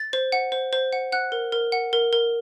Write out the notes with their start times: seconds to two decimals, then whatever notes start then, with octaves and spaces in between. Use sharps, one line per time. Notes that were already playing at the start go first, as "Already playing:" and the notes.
Already playing: A6
0.13 C5
0.32 F#5
0.52 C5
0.73 C5
0.93 F#5
1.12 F#5 F#6
1.32 A#4
1.52 A#4
1.72 F#5
1.93 A#4
2.13 A#4